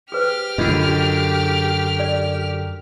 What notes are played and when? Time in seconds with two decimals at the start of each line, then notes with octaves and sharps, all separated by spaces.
0.12 G4 G#4 B4 C5 F6
0.58 F#2 D3 F4 D#5
1.43 G#4
1.99 D5